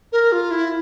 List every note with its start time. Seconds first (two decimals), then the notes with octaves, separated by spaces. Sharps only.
0.12 A#4
0.32 F4
0.51 E4